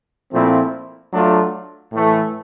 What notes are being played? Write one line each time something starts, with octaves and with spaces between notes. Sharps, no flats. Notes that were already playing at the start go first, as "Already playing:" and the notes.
A#2 F3 A3 C4 E4
F#3 A3 D4 F4
A2 E3 A3